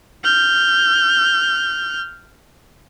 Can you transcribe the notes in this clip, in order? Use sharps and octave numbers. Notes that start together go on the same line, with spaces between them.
F6 G6